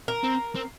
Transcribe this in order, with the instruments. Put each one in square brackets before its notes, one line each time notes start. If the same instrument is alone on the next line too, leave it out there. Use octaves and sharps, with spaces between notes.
[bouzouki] A#4
[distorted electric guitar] C4
C4